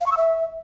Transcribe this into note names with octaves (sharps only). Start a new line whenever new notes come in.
F5
C#6
E6
E5